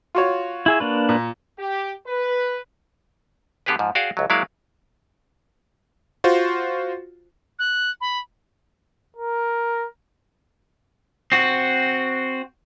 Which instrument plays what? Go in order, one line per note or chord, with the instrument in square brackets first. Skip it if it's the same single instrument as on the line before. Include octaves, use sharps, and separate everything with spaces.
[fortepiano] F4 F#4 C#5
[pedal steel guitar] E4 G#4 E5
A#3 D4 B4
[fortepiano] A#2
[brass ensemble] G4
B4
[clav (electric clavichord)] D3 B3 G4 G#4 B4
G#2 F3
F#4 G#4 D5 F5 G5
C#2 F#3
F#3 G#3 A#3 E4 D5 F5
[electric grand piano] F4 F#4 C5
[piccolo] F#6
B5
[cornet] A#4
[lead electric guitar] C4 F#4